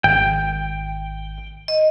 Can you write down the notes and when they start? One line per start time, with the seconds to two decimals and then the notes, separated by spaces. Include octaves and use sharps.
0.04 G#1 G5
1.68 D#5